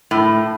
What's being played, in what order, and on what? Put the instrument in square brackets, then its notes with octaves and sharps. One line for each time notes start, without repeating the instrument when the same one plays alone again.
[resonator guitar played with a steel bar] A2